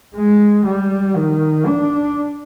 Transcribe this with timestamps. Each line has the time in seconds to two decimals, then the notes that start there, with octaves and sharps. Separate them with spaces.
0.16 G#3
0.66 G3
1.16 D#3
1.67 D4